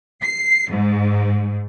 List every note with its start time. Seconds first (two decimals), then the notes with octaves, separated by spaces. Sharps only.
0.22 C7
0.71 G#2